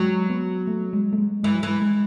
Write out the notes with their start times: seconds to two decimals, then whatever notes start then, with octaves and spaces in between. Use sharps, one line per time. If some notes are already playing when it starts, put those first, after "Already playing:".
Already playing: F#3 G#3
0.30 B3
0.67 A3
0.93 G#3
1.13 A3
1.18 G#3
1.43 E3 G#3
1.55 F#3
1.63 E3 G#3
1.82 G#3